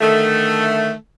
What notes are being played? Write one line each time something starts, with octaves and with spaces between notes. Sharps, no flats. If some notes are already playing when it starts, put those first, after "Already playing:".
D3 D#3 A3